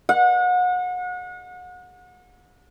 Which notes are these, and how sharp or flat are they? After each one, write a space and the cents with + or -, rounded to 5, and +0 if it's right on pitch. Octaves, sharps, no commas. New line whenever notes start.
F#5 -35